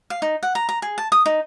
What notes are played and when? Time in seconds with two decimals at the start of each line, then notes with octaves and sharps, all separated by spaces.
0.10 F5
0.22 D#4
0.43 F#5
0.55 A#5
0.69 A#5
0.82 G#4
0.98 A5
1.12 D#6
1.26 D#4